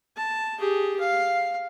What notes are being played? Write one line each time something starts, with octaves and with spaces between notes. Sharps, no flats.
A5
G4 G#4
F5